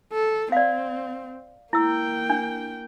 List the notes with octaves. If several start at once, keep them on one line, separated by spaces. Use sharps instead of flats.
A4
C4 D5 F5
A#3 E4 G5 E6
D4